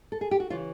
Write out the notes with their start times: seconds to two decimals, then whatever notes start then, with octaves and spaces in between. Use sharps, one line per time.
0.12 A4
0.21 G#4
0.31 G4
0.40 F#4
0.50 C#3 E3 F4